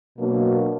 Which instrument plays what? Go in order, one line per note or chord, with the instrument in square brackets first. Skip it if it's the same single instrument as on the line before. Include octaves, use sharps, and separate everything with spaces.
[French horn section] B2 F#3 A#3 D4 F#4